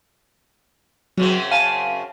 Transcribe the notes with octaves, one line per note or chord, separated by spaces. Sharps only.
F#2 C#3 F#3 C4
F5 G#5 A5